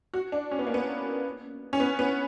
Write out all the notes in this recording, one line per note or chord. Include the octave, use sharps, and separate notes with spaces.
F#4
D4
C#4
B3
A#3
B3
C#4
B3
B3